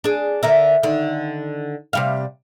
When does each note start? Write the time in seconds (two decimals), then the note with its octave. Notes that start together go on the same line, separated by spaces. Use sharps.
0.04 D4 G#4
0.43 D3 A#4 E5
0.83 D3 D#3
1.93 C3 G3 F5